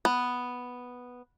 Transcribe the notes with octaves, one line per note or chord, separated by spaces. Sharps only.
B3